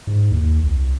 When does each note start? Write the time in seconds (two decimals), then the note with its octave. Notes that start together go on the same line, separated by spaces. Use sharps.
0.07 G#2
0.32 D#2
0.63 C2